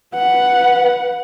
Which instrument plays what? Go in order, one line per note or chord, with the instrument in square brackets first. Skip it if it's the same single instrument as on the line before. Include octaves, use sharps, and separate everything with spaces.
[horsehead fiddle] B4 F#5